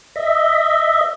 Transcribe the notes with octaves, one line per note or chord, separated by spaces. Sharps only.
D#5 E5